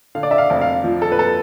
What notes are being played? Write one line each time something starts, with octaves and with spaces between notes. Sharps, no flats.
D3 F5
D5
E5
F5
F1
F5
F3
A4
B4
A4